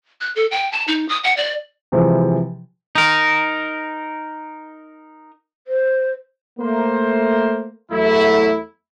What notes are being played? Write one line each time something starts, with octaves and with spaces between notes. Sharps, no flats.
F#6
A4
G5
A5
D#4
D#6
F#5
D5
C3 E3 F3 G#3
D#4 A#4
C5
A3 A#3 C5
E2 F#3 A3 E4